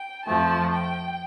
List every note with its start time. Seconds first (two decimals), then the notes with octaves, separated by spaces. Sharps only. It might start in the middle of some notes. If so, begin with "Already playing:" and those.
Already playing: G5
0.27 F2 F3 A3 A5
0.72 G5